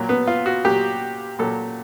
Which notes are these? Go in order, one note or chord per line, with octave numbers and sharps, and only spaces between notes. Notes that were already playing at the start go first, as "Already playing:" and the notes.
Already playing: A#2 F#3
B3
F4
F#4
A#2 F#3 G4
A#2 F#3 A4